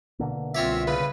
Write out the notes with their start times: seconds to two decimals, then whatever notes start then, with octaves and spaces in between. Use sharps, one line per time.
0.19 B2 D3 A#3
0.55 C2 C4 F4 C#5 D5 E5
0.87 C#3 B4